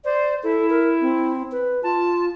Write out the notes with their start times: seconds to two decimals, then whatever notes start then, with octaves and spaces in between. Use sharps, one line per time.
0.05 C5 D5
0.43 E4 A4
0.70 A#4
1.01 C4
1.52 B4
1.83 F4 A5